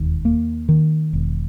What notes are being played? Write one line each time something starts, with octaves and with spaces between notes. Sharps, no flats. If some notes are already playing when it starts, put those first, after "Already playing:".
Already playing: E1 D#2
A#3
D#3
E1